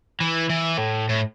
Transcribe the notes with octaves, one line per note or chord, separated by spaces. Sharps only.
E3
E3
A2
A2